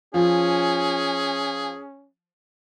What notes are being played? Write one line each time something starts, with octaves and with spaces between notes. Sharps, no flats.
F3 C#4 G#4